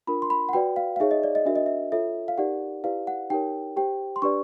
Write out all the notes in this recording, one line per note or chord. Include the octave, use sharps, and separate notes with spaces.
D4 F4 A#4 B5
C6
B5
F#5
F#4 B4 D5 G5
F5
F5
D#4 G#4 C#5 E5
D#5
D5
D#5
D4 F#4 A#4 E5
D#5
E5
F4 A4 C#5 E5
F5
D#4 G4 A#4 D5 F#5
E4 G4 B4 D5 F5
F#5
D#4 G4 A#4 C#5 G5
G4 C5 G5
C6
D4 G4 B4 D5 C#6